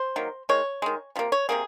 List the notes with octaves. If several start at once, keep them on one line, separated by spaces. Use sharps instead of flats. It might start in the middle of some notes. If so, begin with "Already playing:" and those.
Already playing: C5
D#3 F#3 A#3
D#3 G#3 C#5
D#3 G#3
C3 F3 A#3
C#5
C3 F3 A#3 G#4